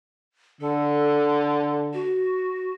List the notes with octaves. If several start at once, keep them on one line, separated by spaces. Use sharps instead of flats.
D3 A4
F#4